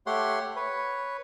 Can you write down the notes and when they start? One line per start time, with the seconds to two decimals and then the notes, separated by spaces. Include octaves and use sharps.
0.06 A3 G4 C#5 F#5 C6
0.56 B4 C#5